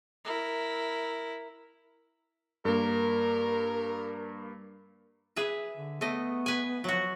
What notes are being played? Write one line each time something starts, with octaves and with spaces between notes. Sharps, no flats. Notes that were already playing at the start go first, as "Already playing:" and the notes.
E4 A#4
G2 A#3 A#4
G#4 B4 E5
D3
A3 B3 D#5
B4 G#5
F3 F#3 F#4